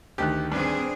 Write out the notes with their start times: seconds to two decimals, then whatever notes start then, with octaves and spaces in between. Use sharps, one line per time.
0.18 D2 D#3 G4 F#6
0.52 G2 C4 D4 G#4